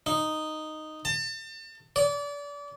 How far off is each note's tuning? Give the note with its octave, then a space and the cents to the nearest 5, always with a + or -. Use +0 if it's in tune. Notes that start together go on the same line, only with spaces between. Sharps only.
D#4 -5
A5 +35
D5 -30